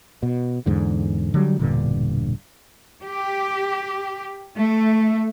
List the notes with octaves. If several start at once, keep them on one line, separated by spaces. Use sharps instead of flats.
B2
E2 G#2 D3
D3 F#3 G3
E1 G2 A#2 D3
G4
A3